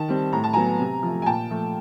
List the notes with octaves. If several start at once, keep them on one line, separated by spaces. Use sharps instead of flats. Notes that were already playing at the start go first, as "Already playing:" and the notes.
Already playing: D#3 A5
G3 C4
A2 A#5
A5
F#3 B3 G#5 A#5
C3
F3 A3
G#5
A#2 G5 A5
F3 A3